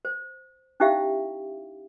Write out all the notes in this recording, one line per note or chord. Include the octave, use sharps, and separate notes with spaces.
C5
C#4 D#4 E4 G4 E5 F5